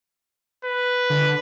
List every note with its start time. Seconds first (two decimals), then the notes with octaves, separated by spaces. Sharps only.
0.65 B4
1.10 D3